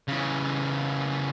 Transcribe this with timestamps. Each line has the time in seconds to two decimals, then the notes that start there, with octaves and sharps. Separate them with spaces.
0.08 C#3 E3